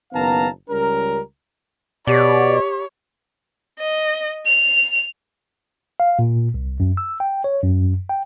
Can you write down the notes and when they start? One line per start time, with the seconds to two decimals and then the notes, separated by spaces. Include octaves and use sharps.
0.13 F#1 D#3 B3 F5 A5 A#5
0.70 C#2 G3 C#4 A#4
2.07 B2 G4 C#5 D5
3.79 D#5
4.46 F7
6.00 F5
6.19 A#2
6.54 C2
6.80 F#2
6.97 E6
7.20 G5
7.44 C#5
7.64 F#2
8.09 G5